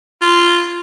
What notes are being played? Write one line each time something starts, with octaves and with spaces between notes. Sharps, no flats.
F4